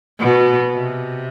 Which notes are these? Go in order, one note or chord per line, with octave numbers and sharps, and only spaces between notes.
B2
C3